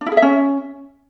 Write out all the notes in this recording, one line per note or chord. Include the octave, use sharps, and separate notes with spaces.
D4
E4
G#4
E5
C#4